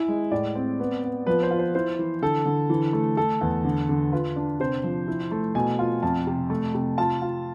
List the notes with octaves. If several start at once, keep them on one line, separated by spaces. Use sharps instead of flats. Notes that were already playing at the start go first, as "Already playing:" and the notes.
Already playing: E4 G#5
G#3
A2 D5
C4
B3
B3
F3 B4
C5
F4
C5
E4 C5
E3
D3 A4
D3
E3
A3
A3 A4
E2
D3
D3
F4 B4
D4
C3 C5
F3
E4
A3
B2 G#5
F4
F2 A5
C3
A3
C3
F4 A5
F4